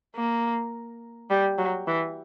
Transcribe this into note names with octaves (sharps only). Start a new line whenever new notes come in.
A#3
G3
F#3
E3